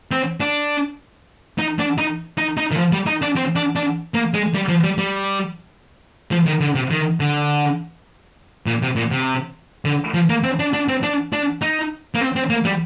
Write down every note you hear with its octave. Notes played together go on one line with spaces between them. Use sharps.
C4
D4
D#4
D4
D#4
D#4
D#4
D#3
F3
G3
D#4
D4
C4
D4
D4
A#3
G#3
G3
F3
G3
G3
F3
D#3
D3
C3
D#3
D3
A#2
C3
A#2
C3
D3
F3
A#3
C4
D4
D4
C4
D4
D4
D#4
A#3
C4
C4
A#3
G3